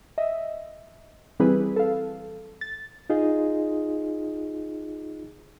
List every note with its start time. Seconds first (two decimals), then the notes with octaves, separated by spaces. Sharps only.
0.18 D#5 E5
1.40 E3 G3 C4 E4 G#4 B4
1.76 A4 F5
2.61 A6
3.10 D#4 F4 G#4 D#5